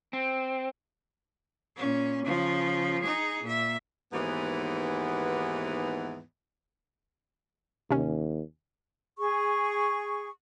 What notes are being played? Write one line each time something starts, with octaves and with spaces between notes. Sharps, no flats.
C4
A#2 C#4
C#3 F3
D#4 G#4
A#2 E5
D#2 G#2 E3 B3
D#2 C3 C#4
G#4 C#6